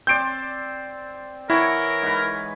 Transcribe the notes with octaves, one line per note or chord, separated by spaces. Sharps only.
C4 C5 D5 G6 D7
E3 E4 A#4 C#5 F#5
G#2 B4